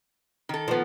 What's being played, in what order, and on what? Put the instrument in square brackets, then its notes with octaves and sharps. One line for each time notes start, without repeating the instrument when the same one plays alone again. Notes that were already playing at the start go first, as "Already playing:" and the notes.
[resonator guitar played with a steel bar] D#3 A4
[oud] F3 B3